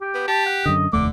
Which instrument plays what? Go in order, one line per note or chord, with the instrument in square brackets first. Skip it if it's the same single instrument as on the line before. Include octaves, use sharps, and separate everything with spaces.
[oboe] G4
[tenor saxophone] B3
[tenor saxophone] G4 [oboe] A5
[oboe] F#5
[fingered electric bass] F#2 D3 [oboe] D#5
[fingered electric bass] F1 D#2 A3 [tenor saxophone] D3 [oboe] D6